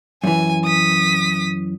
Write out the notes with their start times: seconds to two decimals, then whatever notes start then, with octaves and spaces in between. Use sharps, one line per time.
0.24 F#2 E3 G#5
0.65 D#6 B6